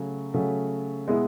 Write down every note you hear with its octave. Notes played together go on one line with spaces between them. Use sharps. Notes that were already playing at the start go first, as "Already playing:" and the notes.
Already playing: C#3 F#3 A3
C#3 F#3 A3
B2 G#3 B3 E4 G#4